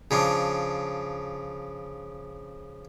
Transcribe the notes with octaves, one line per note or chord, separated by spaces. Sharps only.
C#3 F3 D4